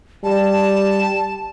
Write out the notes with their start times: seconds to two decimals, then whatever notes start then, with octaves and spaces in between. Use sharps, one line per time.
0.24 G3 A5